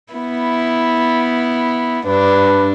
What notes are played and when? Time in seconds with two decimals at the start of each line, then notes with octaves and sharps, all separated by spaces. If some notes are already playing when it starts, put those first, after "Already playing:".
0.13 B3 E4
2.06 G2 D4 B4